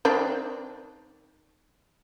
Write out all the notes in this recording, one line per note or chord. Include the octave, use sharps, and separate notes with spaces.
D#3 C4 D4